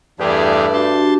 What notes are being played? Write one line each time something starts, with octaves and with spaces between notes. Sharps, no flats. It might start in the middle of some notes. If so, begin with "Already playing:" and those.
E2 G2 A3 G4 G#4 D5
D4 F#4 G4 A5 C6